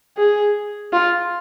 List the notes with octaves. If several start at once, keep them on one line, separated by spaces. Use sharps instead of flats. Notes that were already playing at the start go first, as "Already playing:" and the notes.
G#4
F4